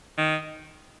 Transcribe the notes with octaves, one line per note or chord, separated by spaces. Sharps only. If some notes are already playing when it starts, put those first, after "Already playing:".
D#3